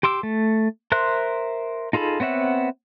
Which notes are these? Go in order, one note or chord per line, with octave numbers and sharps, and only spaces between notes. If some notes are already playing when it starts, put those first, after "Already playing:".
G4 C6 D6 E6
A3
A#4 C5 E5 C6 F#6
D#4 F4 G#4 A4 B5
B3 C4 C#5 E5 F#5